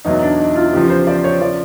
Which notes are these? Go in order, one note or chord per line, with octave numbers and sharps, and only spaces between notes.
E2 B2 F#3 D#4
D4
D#4
F4
E2 C#3 F3 G4
C5
D5
C#5
C#3 F3 D5